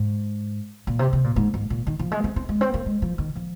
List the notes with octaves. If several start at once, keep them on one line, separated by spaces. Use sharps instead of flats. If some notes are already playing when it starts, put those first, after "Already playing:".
Already playing: G#2
A#2
C3
C3
A#2
G#2
G#2
A#2
D#3
F3
G#3
C4
C4
G#3
C4
A#3
G#3
F3
D#3
F3